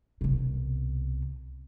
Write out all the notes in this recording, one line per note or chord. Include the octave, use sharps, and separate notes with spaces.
C2 B2